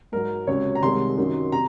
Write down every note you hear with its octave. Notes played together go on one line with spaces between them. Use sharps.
G#2 F#3 A#4
C#2 C3 F#3 C#5
A#5
C2 C3 D#3 G#3 C6
F#2 D#3 F#3
C3 A#5